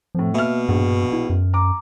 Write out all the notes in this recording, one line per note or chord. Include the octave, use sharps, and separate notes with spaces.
F2 A2 F3
B2 A#3 E5 F6
A#1 G2
E4
F#2
A#5 D6